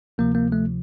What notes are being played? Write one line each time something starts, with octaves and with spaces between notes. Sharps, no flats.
D2 C3 F3 A#3
A#3
A3